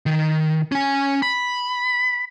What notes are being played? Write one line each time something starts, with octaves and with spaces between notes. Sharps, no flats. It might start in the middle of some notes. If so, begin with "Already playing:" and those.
D#3
C#4 G#5
B5